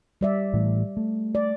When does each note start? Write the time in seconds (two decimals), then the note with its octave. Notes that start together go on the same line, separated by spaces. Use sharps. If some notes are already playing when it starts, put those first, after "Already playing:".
0.21 G3 D5 E5
0.53 A2 E3 A3
0.97 A3
1.35 D5